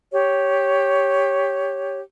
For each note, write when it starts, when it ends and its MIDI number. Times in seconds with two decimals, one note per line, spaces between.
0.12 2.00 67
0.12 2.00 73